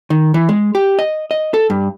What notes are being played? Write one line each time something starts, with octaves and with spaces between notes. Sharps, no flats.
D#3
E3
G#3
G4
D#5
D#5
A4
G2